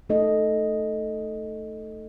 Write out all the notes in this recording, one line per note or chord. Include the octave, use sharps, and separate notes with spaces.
A3 D#4 A4 D#5